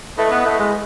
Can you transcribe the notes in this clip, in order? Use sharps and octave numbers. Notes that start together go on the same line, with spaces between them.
A3 E4 B4 D#5
B3
A3
G#3